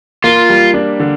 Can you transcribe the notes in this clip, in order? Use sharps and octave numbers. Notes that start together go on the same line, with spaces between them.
A#3 F4
G3
D4
D3